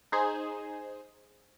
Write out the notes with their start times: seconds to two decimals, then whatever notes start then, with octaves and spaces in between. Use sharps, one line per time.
0.12 D#4 G#4 C5